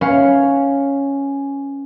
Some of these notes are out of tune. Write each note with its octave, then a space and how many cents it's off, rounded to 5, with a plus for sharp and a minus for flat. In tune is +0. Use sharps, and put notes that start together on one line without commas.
C#4 +0 B4 +0 F5 +0